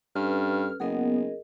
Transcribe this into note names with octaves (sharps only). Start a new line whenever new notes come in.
G2 C#4 A4 B4 F6
F#1 B3 G#4 A#4 D#5